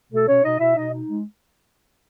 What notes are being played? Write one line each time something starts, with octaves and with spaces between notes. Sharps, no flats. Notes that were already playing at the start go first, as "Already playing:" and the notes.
B2 A3 A4
B2 C#4 C#5
B2 D#4 D#5
B2 E4 E5
B2 D#4 D#5
D#4
G#3